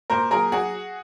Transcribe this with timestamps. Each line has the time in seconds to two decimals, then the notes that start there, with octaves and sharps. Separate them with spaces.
0.10 A#2 A#4 C5
0.31 F#3 G#4 A#4
0.52 F#3 F#4 G#4